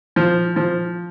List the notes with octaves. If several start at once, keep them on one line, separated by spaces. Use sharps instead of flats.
F3
F3